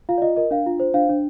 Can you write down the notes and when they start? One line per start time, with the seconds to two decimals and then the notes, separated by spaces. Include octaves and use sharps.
0.09 F4 F5
0.18 D5
0.22 F4 D#5
0.36 A#4 D#5
0.51 D4 F5
0.66 F4
0.80 C5
0.94 D4 F5
1.09 D4